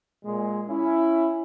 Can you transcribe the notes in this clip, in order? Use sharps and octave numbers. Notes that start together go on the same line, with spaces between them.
A#2 G#3
C#4 E4